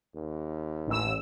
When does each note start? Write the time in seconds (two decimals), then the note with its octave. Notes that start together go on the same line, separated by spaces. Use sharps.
0.15 D#2
0.87 A1 E6